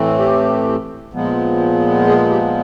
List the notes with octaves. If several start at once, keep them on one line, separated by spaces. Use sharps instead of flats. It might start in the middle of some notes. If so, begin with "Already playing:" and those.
Already playing: A2 E3 A3 C4
G4
A#2 F3 G#3 B3
G#4
G4